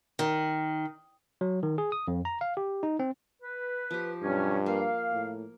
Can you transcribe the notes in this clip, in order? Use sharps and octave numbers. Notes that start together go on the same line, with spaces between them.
D#3
F#3
D#3
G#4
D#6
F2
A#5
F5
G4
D#4
C4
B4
F3 G4
G2 B2 F#3 C#4
A#3 F5
A2